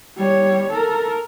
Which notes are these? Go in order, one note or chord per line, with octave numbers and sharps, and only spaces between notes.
G3 C#5
A4 A#4